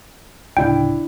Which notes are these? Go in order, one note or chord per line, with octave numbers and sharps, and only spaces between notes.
D1 C#3 D4 E4 G5